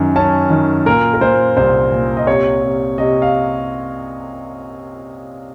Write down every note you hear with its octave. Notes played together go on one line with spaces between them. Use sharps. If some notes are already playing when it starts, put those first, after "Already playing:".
Already playing: F#2 D#3
C#4 A5
D#3
A#2 A#4
A#4
A#2 C5
C2 C5
A#2
D#5
C3 C#5
C3
C3 D#5
F5